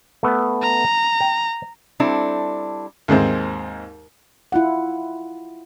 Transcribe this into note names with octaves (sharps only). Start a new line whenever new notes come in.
A3 B3
A#5
G5
G3 C4 D4 E4 A4
D#2 G#2 G#3 C4
E4 F4 F#5